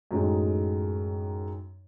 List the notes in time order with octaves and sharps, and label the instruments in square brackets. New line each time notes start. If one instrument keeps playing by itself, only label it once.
[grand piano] F#2 A2 D#3 G#3 D#4